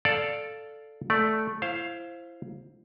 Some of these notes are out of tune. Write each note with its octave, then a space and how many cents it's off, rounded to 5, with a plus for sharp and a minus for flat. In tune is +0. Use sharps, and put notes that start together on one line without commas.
A4 +0 D5 +0 F5 +0
A3 -5 D5 +0
E4 +30 C5 +10 F5 +0